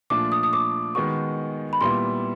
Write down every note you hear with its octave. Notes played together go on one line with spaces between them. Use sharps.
A#2 F3 A3 D4 F4 D6
D#6
D#6
D6
D#3 G#3 B3 D#4 F#4 C#6
B5
A#2 G3 B3 E4 C6